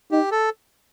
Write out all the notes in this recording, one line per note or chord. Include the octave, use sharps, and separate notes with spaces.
D#4 G4
A4